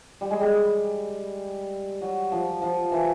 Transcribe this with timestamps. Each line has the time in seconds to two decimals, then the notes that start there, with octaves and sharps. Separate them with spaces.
0.21 G3
0.30 G#3
0.41 G3
2.01 F#3
2.32 F3
2.62 F3
2.92 E3